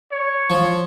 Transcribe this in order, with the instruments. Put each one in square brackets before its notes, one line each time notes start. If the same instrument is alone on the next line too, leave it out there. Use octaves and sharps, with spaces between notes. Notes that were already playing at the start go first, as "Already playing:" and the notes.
[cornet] C#5
[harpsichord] F3